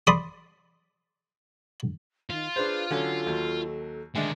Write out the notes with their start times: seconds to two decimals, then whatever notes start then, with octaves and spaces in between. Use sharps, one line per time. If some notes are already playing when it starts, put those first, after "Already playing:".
0.07 D5 B5 C6 D#6
2.30 D#3 F4
2.56 D4 G#4 B4 C5
2.91 D3 F#3 C#4 A4
3.27 D#2 F#3
4.15 D3 D#3 G#3 D4 E5